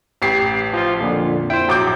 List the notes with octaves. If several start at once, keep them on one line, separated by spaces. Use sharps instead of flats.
A1 G4 C7
F3 F4
F2 A#2 D3
E4 C5 G5
A#1 F#3 D6 G6